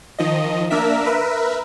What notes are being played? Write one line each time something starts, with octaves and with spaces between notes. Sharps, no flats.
D#3 F3 D#5
A#3 D4 A#4 E5 B6
A#4 B4 E5